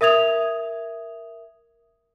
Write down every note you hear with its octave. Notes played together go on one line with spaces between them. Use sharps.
A#4 E5 D#6 G#6 F7